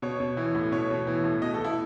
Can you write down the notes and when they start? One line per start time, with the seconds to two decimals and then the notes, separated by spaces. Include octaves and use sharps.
0.02 B2 C#5
0.20 B2
0.37 E3
0.55 A2
0.72 B2 C#5
0.90 B2
1.07 E3
1.24 A2
1.42 B2 D#5
1.54 A4
1.60 B2 E4